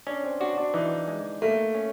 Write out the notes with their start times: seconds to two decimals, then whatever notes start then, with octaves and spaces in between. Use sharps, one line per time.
0.07 C#4 D4
0.23 C4
0.40 D4 F#4
0.58 D4
0.74 E3 D#4
1.08 G#3
1.42 A3 A#3
1.75 C#4